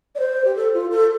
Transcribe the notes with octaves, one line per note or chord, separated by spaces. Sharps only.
D5
C5
G4
A4
F4
A4